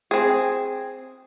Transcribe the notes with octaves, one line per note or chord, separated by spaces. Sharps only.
C4 G#4